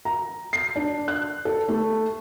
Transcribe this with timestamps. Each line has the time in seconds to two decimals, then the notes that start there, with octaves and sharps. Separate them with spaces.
0.05 A#5
0.53 C7
0.76 D4
1.08 F#6
1.45 A4
1.69 A3